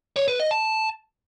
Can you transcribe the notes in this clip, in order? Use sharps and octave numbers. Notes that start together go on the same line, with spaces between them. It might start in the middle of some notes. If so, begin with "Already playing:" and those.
C#5
B4
D#5
A5